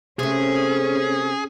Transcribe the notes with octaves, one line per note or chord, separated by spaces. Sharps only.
C3 A3 C#4 G#4